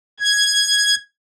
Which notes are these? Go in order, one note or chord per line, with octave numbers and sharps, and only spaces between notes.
G#6